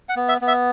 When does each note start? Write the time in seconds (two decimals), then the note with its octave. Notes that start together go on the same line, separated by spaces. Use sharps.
0.09 F#5
0.16 B3
0.28 E5
0.41 B3
0.48 E5